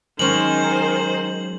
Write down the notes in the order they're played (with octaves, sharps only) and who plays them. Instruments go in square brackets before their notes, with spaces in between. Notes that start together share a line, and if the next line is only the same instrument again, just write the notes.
[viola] D#3 C5 [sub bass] F#3 [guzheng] G#3 C#4 [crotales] F#7